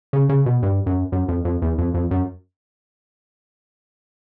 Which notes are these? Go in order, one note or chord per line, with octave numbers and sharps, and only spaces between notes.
C#3
C#3
B2
G2
F#2
F#2
F2
F2
E2
F2
F2
F#2